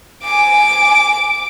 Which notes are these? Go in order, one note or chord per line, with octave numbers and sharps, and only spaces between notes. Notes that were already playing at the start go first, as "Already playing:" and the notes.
G#5 D6